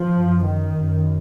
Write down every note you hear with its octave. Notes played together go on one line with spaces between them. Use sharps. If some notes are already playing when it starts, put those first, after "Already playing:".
Already playing: F3
F#2
D#3
F#2